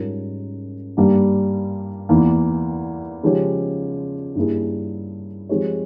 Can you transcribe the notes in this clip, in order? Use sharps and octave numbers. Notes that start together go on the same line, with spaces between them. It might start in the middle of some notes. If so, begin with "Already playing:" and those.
Already playing: G#2 G3 C#4 F4 A#4
G2 G3 A#3
E2 E3 A#3
C#3 F3 G#3 C#4 G4
G2 G3 A#3 E4 G#4
F3 G#3 C4 G4 C#5